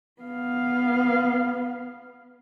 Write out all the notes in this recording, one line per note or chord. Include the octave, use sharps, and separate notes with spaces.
B3 F5